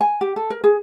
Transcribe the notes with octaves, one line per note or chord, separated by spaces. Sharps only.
G#5
G4
A4
A#4
G#4